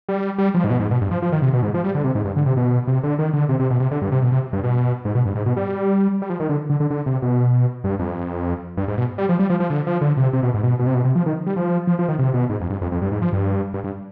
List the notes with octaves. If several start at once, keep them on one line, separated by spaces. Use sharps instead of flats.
G3
G3
F3
G#2
B2
G#2
B2
G2
F3
F3
D#3
C3
B2
G#2
F3
G3
D3
C3
G#2
G2
D3
C3
B2
C3
D3
D#3
D3
C3
C3
B2
C3
D3
G2
C3
B2
C3
G2
B2
G#2
B2
G2
G#2
B2
G3
G3
F3
D#3
D3
D3
D3
D3
C3
B2
G2
F2
G2
G#2
B2
G3
F3
G3
F3
F3
D3
F3
D3
C3
C3
B2
G#2
B2
B2
C3
B2
C3
F3
D#3
G3
F3
F3
F3
D#3
C3
B2
G#2
F2
G2
F2
F2
G2
G#2
F3
G2
G2
G2